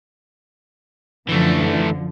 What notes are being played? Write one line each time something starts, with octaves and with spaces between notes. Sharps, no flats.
F#2 D3 E3 F3 A3